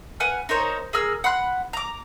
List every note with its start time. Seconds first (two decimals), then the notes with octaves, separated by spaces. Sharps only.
0.20 B4 F#5 G#5 F6
0.49 D#4 A#4 C5 C#5
0.93 G#4 A#4 E6 F6
1.24 F#5 B5 C6 F#6
1.73 A#5 D6